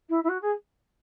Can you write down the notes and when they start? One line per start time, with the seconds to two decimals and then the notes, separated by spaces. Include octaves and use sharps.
0.09 E4
0.23 E4
0.28 F#4
0.41 G#4